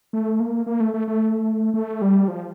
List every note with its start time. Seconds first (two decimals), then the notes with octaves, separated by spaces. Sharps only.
0.13 A3
0.40 A#3
0.67 A#3
0.80 A3
0.94 A3
1.08 A3
1.74 A3
2.02 G3
2.28 F3